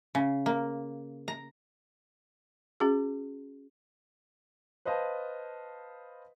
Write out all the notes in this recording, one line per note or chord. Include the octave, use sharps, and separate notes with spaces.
C#3
A#3
A#5
C#4 F#4 G#4
B4 C5 D#5 F5 A5